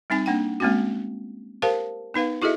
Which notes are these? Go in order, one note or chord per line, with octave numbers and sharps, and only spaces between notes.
G3 C4 D#4 G#5
A#3 D4 F#5 G5
G#3 A#3 C4 C#4 F#4
G4 A#4 C5 F5 A5
B3 D#4 B4 F5
E4 F#4 G#4 A4 D#5 E5